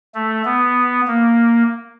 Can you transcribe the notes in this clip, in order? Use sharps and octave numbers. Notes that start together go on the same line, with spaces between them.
A3
B3
A#3